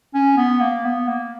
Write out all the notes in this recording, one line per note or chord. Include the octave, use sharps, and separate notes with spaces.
C#4
B3
A#3
B3
A#3